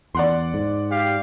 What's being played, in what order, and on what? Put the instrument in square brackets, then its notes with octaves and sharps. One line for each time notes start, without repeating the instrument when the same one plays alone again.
[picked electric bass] E2 [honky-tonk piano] D5 F#5 C6
[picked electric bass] G#2
[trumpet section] G4 F5